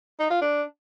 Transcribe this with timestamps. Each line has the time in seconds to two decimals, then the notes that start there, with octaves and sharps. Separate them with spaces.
0.20 D#4
0.30 F4
0.41 D4